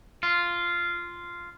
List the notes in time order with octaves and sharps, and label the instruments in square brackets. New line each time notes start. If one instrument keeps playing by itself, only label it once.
[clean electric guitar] F4